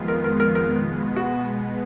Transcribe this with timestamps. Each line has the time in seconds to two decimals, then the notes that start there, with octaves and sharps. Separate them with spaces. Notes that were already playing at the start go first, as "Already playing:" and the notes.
Already playing: F2 D#3 G#3 B3 F4
0.08 A#4
0.24 A#4
0.40 A#4
0.55 A#4
0.70 B2 G#3 B3
1.16 F#4